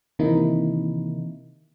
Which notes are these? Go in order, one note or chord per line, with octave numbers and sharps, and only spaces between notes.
C3 D#3 E3 A#3 D#4 E4